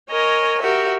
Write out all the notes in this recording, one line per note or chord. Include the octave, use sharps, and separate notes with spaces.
A#4 C#5 D#5 G#5
F#4 G4 A#4 E5